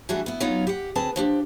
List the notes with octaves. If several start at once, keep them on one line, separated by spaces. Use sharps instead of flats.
E3 G3 A3 D4 F#4 G#4
B3 E4
F#3 B3 C#4 D#4 F4
G4 F#5
D2 C4 G#4 B4 A5
F3 D4 G4